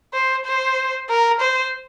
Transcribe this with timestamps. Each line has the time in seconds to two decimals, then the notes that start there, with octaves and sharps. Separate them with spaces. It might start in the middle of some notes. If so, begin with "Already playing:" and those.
0.14 C5
0.46 C5
1.09 A#4
1.41 C5